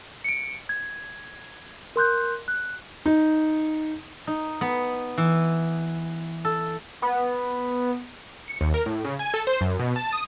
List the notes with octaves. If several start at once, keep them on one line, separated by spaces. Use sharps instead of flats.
C#7 D7
G#6
A#4 C6 F#6 G6
F#6
D#4
D#4
B3
E3
A4
B3
C#7
D#2
A#4
A2
C#3
G#5
A4
C5
F#2
B2
A5
D#6